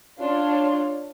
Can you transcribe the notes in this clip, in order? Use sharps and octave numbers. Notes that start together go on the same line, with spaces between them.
D4 F4 C#5